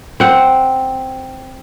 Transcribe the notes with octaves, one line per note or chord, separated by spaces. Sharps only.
C4 F#5